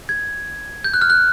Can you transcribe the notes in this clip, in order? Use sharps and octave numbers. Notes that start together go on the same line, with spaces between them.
G#6
G6
F#6
F6
F#6